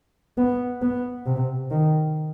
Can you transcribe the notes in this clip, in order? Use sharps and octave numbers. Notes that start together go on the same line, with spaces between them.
B3
B3
C3
D#3